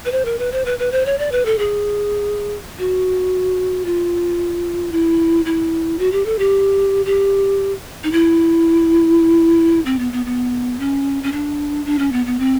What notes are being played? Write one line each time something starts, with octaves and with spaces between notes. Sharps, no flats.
B4
C5
A#4
B4
C5
B4
B4
C5
C#5
D5
B4
A4
G#4
F#4
F4
E4
E4
F#4
G4
A4
G4
G4
D#4
E4
C4
B3
B3
B3
C#4
C#4
D4
D4
C#4
B3
B3
C4